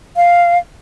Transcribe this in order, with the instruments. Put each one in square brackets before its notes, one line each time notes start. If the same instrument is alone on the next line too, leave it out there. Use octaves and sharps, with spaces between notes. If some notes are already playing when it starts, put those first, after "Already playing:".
[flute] F5